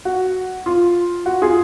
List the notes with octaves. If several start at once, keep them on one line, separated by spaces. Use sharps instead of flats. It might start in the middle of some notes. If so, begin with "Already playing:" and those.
F#4
F4
F#4
F4 G#4